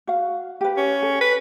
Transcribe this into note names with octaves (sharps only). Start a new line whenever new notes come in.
F#4 F5
G4 B4
C#4
A4
B4